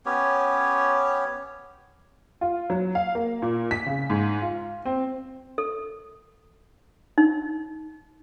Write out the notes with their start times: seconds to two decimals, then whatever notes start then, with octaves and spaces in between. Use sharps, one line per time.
0.06 B3 C#4 G4 C#5
2.41 F4
2.70 F#3
2.95 F5
3.15 A#3
3.42 A#2
3.71 B6
3.86 C#3
4.10 G#2
4.42 F4
4.85 C4
5.58 A4
7.18 D#4